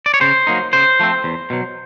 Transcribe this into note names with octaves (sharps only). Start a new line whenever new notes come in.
D5
C#5
C#3 C5
F#3 A#3 D#4
C#3 C5
F3 A3 C4
E2
B2 F#3